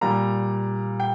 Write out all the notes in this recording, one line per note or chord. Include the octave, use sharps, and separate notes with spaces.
A#2 G3 A#5
G5